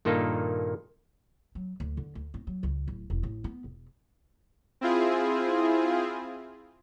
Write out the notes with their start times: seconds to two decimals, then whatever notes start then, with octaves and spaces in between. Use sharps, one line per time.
0.05 G2 A#2 D#3 A#3 D#4 A4
1.55 F#3
1.80 D2
1.97 D3
2.15 D2
2.34 C4
2.47 F#3
2.63 C#2
2.88 D1
3.10 E1
3.23 A1
3.44 B3
3.64 E1
4.81 C4 E4 F4 G#4